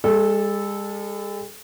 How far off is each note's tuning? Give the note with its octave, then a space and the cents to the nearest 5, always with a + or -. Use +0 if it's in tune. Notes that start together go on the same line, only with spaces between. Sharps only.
G#3 -45 A4 -10